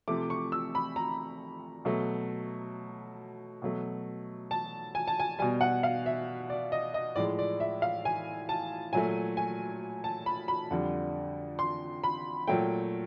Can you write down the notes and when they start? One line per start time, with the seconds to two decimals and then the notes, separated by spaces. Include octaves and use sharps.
0.08 C3 F3 A3 D6
0.30 C#6
0.52 E6
0.75 B5
0.96 A#5
1.85 B2 F#3 A3
3.62 B2 F#3 A3
4.51 A5
4.95 G#5
5.07 A5
5.20 G#5
5.39 B2 G3 G#5
5.61 F#5
5.83 F5
6.06 E5
6.50 D5
6.72 D#5
6.94 D#5
7.16 A2 F3 G#3 D5
7.39 D5
7.60 E5
7.82 F5
8.05 G#5
8.49 A5
8.93 A#2 F#3 A3 G#5
9.37 G#5
10.04 A5
10.26 B5
10.48 B5
10.71 F2 D3 G3
11.59 C6
12.04 B5
12.47 A#2 F#3 A3 G5